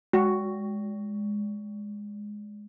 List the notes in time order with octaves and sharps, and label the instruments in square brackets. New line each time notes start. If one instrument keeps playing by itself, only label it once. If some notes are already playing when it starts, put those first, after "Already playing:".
[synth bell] G#3 [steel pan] F#4